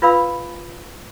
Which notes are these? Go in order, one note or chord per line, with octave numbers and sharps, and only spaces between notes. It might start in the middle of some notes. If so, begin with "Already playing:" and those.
F4 B4 D5 F5 B5 E6